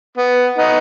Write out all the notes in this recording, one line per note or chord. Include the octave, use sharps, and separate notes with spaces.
B3
B3 D#4